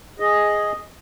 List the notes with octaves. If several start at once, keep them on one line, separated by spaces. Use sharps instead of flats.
G#4 D#5